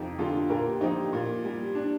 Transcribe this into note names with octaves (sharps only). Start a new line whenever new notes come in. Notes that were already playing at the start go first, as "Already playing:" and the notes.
Already playing: F2 C3 D#4 G4
D3 F4 A4
A#2 G4 A#4
F3 D#4 G4
A#2
G3
D4